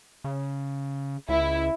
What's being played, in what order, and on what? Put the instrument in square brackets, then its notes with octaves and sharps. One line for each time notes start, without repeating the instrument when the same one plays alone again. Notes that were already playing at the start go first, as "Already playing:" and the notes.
[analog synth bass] C#3
[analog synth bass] C#2 [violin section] E4